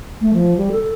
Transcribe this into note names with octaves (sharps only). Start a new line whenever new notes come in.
A3
F3
G3
A4